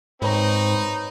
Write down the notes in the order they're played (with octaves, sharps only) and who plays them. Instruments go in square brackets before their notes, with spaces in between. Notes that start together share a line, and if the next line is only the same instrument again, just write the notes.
[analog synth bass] G#2 [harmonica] C4 [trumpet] D#4 [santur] B4 C#5 A#5